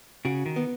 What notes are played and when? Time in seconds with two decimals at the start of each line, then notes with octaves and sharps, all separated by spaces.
0.25 C#3 F#4
0.46 D#3
0.56 B3